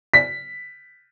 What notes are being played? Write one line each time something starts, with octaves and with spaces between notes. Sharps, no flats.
B6